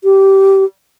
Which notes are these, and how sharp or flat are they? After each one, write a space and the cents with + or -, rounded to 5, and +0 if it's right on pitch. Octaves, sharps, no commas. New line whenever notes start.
G4 -15